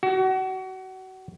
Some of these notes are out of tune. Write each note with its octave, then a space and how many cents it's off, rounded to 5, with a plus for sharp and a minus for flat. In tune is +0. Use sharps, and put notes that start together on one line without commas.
F#4 +30